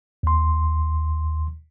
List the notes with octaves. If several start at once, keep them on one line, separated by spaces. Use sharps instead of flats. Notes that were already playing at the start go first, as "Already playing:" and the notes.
D#2 C6